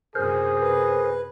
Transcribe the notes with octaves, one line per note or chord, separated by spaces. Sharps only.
F#2 C3 G#4 A#4 C5
B4